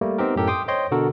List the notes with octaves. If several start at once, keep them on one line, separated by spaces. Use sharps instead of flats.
G3 A3 A#3
B3 C4 D#4 G4 A#4
F#2 A2 G4 A4 A#4
G5 C6 D6 D#6
C5 C#5 D#5 G5 C6
B2 D3 F#4 A4 A#4